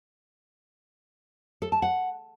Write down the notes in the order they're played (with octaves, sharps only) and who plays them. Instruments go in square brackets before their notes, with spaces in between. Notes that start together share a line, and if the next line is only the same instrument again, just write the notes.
[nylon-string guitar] A4
A5
F#5